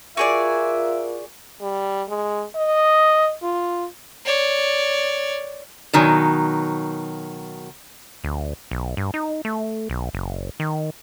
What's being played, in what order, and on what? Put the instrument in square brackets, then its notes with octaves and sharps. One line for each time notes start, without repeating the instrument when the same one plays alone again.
[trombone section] F4 A#4 [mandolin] F#4 G#4 D5 [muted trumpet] E5
[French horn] G3
G#3
D#5
F4
[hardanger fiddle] C#5 D5
[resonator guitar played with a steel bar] B2 D#3 F#3 G#5
[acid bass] D2
B1
G2
D#4
A3
B1
F#1
D#3